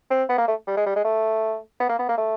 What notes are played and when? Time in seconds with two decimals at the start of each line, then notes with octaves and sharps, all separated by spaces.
0.10 C4
0.29 B3
0.38 A#3
0.48 A3
0.67 G3
0.77 G#3
0.86 G3
0.96 G#3
1.04 A3
1.80 B3
1.89 A#3
1.99 B3
2.09 A#3
2.18 A3